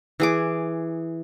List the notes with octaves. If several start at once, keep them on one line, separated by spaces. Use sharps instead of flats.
E3 G#4 D6